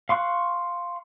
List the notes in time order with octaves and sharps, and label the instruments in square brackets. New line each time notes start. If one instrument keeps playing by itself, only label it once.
[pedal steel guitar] F5 C6 C#6 F#6